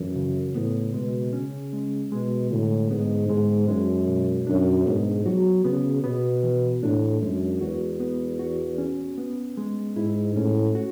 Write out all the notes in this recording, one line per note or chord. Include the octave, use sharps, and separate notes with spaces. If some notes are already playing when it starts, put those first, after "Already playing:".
Already playing: F#2 E3
C#3
A2 B3
B2 G#3
C#3 C#4
G#3
B2 G#3
A2 D3
G#2 B3
G#2 G#3
F#2 G#3
B2
F#2 D4
G#2 B3
F#3 F#4
C#3 B3
B2 B3
E3
A2 D4
F#2 G#3
E2 F#4
B3
F#4
C#4
B3
G#3
G#2 E4
A2 C#4
F#4